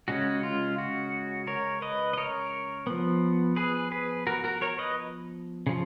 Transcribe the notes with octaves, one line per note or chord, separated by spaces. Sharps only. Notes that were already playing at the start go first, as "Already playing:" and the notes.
C#3 G#3 C#4 F#4
F4
F#4
A#4 C#5
B4 D#5
D#5
A#4 C#5
F3 B3
G#4 B4
G#4 B4
F#4 A#4
F#4 A#4
A#4 C#5
B4 D#5
C#3 F3